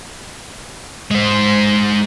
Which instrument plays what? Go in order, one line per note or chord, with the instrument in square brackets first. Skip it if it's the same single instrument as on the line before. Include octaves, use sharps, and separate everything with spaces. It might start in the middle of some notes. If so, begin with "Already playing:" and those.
[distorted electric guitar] G#3 C5